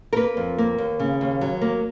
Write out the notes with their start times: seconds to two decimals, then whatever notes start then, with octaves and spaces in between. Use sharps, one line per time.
0.13 A#4
0.16 A#3 B4
0.37 F2
0.58 A#3
0.78 D#2
0.99 C#3
1.21 D#2
1.41 F#3
1.61 A#3